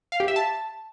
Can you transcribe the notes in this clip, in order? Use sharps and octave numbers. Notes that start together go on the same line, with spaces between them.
F5
G4
E5
A5